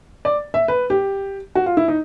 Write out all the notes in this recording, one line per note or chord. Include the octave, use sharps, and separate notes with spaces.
D5
E5
B4
G4
F#4
F4
E4
D#4